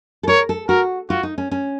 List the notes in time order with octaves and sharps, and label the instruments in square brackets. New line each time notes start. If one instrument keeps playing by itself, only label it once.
[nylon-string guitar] A4
[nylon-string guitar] A#4 [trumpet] C#5
[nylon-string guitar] A4
[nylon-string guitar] F#4 [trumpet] A#4
[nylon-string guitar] F4 [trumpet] F#4
[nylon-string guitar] D#4
C#4
C#4